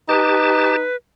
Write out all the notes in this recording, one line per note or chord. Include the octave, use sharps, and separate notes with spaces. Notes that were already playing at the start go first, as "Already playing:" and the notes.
D#4 G4 B4 A5